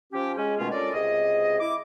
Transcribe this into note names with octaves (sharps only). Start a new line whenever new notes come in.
F3 C#4 G4
G#3 C#4
B2 D#3 G#3 A3 C#4 F4
C#4 D4 F4 A4 A#4 D5
C#2 C3 G#4 D#5
E4 D6